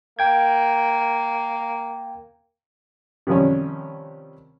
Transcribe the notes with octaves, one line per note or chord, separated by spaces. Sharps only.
A#3 G5 G#6
C3 D#3 F3 G3 C#4